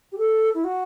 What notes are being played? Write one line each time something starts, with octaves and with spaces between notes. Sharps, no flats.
G4
A4
E4
F#4